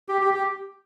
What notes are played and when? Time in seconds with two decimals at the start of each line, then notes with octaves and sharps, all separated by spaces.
0.09 G4
0.22 G4
0.34 G4